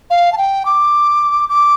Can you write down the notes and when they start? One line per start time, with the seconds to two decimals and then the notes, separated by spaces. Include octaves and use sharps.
0.10 F5
0.33 A5
0.38 G5
0.66 D6
1.49 D6